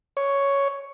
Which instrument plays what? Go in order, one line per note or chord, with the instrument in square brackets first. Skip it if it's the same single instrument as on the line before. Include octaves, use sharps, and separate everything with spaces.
[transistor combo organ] C#5